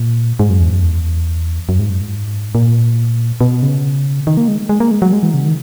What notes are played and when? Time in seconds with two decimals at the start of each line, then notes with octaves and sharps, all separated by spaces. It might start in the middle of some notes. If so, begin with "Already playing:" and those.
Already playing: A#2
0.39 G#2
0.50 F#2
0.60 E2
0.72 F#2
0.82 E2
1.69 F#2
1.79 G#2
1.90 F#2
2.01 G#2
2.55 A#2
3.41 B2
3.62 C#3
4.27 D#3
4.37 A#3
4.48 G#3
4.69 G#3
4.80 A#3
4.91 G#3
5.02 F#3
5.13 G#3
5.23 E3
5.34 C#3
5.45 D#3